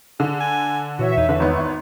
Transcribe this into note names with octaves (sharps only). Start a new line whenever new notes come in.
D3 G#4
G#5
A#2 E3 F#4 C#5 E5
E2 D#4
D3 B4
G#1 B3